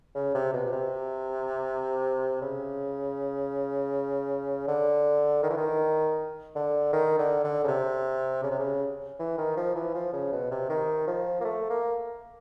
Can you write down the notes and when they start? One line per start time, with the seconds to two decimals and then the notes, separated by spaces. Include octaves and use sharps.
0.15 C#3
0.35 C3
0.53 B2
0.66 B2
0.72 C3
2.41 C#3
4.67 D3
5.43 D#3
5.50 E3
5.57 D#3
6.56 D3
6.93 D#3
7.18 D3
7.44 D3
7.64 C#3
7.68 C3
8.43 C#3
8.51 C3
8.59 C#3
9.19 E3
9.38 D#3
9.57 F3
9.75 E3
9.94 F3
10.13 C#3
10.32 B2
10.51 C3
10.69 D#3
11.07 F3
11.40 A#3
11.45 A3
11.70 A#3